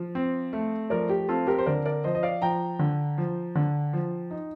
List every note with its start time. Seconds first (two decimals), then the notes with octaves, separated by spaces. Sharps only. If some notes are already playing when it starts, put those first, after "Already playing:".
Already playing: F3
0.15 C4
0.53 A3
0.90 F3 A#4 D5
1.09 G4
1.29 C4 F4 A4
1.47 G4 A#4
1.58 C5
1.66 D3 A#4 D5
1.86 A#4 D5
2.04 F3 C5 D#5
2.15 D#5
2.23 D5 F5
2.42 F3 G5 A#5
2.79 D3
3.18 F3
3.55 D3
3.93 F3
4.31 D#4